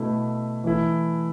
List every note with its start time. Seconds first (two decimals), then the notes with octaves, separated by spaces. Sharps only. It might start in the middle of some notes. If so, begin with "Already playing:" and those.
Already playing: B2 A3 E4
0.64 E3 A3 E4